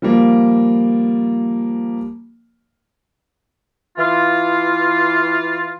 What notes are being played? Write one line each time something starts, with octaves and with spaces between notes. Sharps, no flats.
F3 G3 A#3
E3 F4